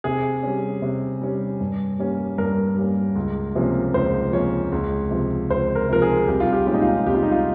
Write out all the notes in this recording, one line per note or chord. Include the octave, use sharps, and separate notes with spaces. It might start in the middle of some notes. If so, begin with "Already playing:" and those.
C3 G#4
G3 C#4
C3
G3 C#4
G2
G3 A#3 C#4
G2 A#4
G3 A#3 C#4
C#2
C3 F3 A#3 C#4
C#2 C5
C3 F3 A#3 C#4 C#5
C#2
C3 F3
C#2 C5
A#4
C3 F3 A#4
G#4
C2 G4
F4
G4
A#2 G#3 C#4 F4
D#4
F4
C2 G4
F4
D#4
F4